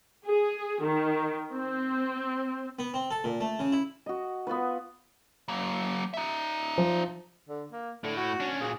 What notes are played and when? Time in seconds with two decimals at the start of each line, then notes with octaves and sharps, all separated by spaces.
0.24 G#4
0.82 D#3
1.53 C4
2.79 B3
2.94 C4
3.11 A4
3.24 A#2
3.41 A3
3.59 C#3
3.72 E4
4.06 F#4 D#5
4.47 B3 F4 F#4 B4
5.48 F#3 A#3
6.14 D#4 E5
6.78 F3
7.49 D3
7.72 A#3
8.04 A2 D3
8.17 F#4
8.40 C#4 D4
8.61 A#2 F#3 G#4